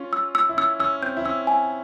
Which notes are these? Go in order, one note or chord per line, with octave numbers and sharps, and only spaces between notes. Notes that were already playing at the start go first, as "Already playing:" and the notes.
Already playing: C#4 F4
E6
E6
E4
C#4 E6
C#4 E6
C4 G6
E4
C#4 E6
G#5